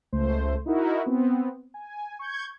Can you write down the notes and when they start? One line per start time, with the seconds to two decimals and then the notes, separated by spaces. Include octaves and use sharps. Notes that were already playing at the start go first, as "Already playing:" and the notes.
0.13 C#2 A3 C5
0.66 D#4 E4 F#4 A#4
1.06 B3 C4
1.74 G#5
2.19 C#6 G6 G#6